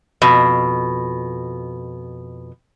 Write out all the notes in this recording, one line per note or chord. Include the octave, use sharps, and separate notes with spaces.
F2 B2